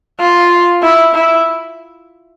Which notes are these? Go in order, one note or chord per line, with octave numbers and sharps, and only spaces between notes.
F4
E4
E4